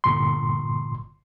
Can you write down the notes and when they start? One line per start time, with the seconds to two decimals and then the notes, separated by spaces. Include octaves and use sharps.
0.04 G1 A#2 C6